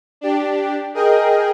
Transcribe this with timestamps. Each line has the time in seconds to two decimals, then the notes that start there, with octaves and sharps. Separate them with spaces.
0.21 D4 G4
0.94 G#4 A#4 D#5 G5